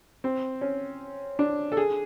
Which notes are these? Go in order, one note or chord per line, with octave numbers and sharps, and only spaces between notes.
C4
C#4
D4
A4
G#4